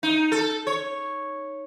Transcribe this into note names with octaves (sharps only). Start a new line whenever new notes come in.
D#4
A4
C#5